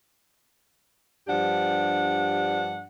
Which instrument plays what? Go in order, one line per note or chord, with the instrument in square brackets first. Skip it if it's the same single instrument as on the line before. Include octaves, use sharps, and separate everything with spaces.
[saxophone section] G2 F3 D4 G4 F#5